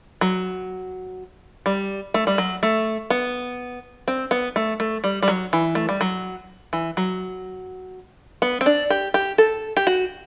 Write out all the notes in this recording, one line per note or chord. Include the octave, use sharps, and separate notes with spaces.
F#3
G3
A3
G3
F#3
A3
B3
C4
B3
A3
A3
G3
G3
F#3
E3
A3
G3
F#3
E3
F#3
B3
C4
D4
G4
G4
A4
G4
F#4